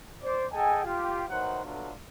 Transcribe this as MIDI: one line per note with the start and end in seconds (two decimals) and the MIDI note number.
0.23 0.45 72
0.23 0.45 74
0.53 0.82 68
0.53 0.82 69
0.53 0.82 75
0.53 0.82 79
0.53 0.82 80
0.84 1.24 65
0.84 1.24 67
1.30 1.63 51
1.30 1.63 52
1.30 1.63 54
1.30 1.63 72
1.30 1.63 78
1.64 1.92 50
1.64 1.92 54
1.64 1.92 57
1.64 1.92 59
1.64 1.92 62
1.64 1.92 65